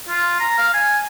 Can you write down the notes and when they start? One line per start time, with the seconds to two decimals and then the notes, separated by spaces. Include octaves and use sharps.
0.09 F4
0.40 A#5
0.58 F5
0.74 G#5